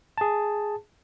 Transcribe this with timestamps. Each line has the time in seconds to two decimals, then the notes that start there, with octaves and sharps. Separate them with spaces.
0.18 G#4 A5